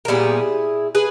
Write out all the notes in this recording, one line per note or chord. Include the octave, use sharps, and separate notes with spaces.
A#4
A#2 G3 B3 E4 G#4
G#4 B4